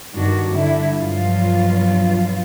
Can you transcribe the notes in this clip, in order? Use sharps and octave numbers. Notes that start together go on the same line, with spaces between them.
G2 D#3 D4 F#4
D3 G3 E4
G2 B2 F3 F#3 F4